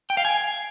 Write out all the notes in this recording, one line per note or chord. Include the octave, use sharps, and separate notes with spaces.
G5
F5
G#5